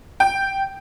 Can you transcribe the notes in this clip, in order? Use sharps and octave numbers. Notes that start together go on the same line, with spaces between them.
G5